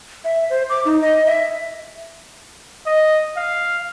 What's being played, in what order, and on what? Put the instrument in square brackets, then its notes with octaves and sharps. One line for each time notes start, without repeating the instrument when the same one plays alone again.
[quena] E5
C5
D6
D#4
D#5
E5
[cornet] D#5
F5